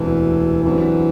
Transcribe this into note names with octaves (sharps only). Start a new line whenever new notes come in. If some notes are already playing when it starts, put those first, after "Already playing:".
Already playing: E1 D2 C3 E3 G3
G2 D3 E3 F#3 C4 F#4